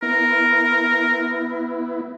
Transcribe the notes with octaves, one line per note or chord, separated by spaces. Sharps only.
B3 E4 A#4